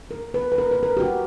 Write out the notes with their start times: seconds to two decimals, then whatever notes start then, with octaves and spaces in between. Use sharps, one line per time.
0.11 A#4
0.34 B4
0.52 B4
0.58 A#4
0.71 B4
0.83 A#4
0.97 G4
1.00 F#4